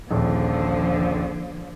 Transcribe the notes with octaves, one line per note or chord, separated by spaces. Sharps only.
D#1 A#1 D3 F3